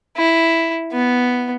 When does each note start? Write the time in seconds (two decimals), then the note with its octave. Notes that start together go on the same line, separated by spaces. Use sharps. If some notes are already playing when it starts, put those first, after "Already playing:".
0.17 E4
0.92 B3